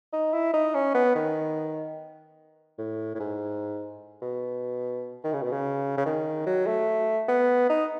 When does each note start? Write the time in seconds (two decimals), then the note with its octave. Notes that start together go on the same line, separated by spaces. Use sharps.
0.13 D#4
0.33 E4
0.54 D#4
0.74 C#4
0.94 B3
1.15 D#3
2.78 A2
3.15 A2
3.19 G#2
4.22 B2
5.24 D#3
5.33 C#3
5.43 B2
5.52 C#3
5.97 C#3
6.06 D#3
6.46 F#3
6.67 A3
7.28 B3
7.69 D#4